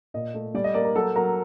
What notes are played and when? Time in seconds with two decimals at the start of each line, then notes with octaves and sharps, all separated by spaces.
0.14 A#2 D#5
0.34 A3
0.54 G3 D5
0.64 D#5
0.74 A#3 D5
0.84 A#4
0.95 F#3 A4
1.16 F#3 A#4